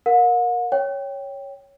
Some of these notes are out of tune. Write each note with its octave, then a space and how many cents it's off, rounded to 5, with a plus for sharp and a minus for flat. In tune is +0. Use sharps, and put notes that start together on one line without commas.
A#4 +10 F#5 -45
C#5 +0 G5 +0